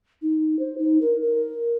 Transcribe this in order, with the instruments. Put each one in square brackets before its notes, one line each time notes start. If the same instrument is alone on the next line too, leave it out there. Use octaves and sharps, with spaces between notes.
[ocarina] D#4
C5
D#4
A#4
A#4